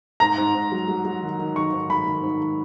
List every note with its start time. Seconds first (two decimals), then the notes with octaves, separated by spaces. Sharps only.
0.20 G#2 A#5
0.38 G#2
0.55 G#2
0.72 F#3
0.88 F#3
1.05 F#3
1.22 D#3
1.39 D#3
1.55 D#3 C#6
1.73 G#2
1.90 D#3 B5
2.06 D#3
2.23 G#2